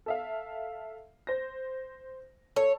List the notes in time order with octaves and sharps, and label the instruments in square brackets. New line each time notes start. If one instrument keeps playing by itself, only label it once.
[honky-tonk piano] A4 E5 F5
C5 A#6
[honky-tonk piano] A4 [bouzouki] C#5